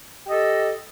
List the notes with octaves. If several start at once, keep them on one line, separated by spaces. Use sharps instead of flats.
G4 A4 D#5